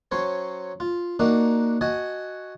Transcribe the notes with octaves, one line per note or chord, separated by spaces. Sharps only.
F#3 C#4 C5 C#5
F4
A#3 D4 D#4 F#4
F#4 D#5 G#5 A5